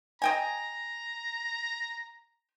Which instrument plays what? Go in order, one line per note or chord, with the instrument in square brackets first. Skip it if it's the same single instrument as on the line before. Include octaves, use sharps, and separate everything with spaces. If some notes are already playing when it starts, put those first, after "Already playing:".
[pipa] D#5 G5 G#5 [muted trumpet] A#5